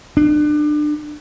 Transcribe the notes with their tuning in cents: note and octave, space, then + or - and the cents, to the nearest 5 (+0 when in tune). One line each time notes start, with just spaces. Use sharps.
D4 +30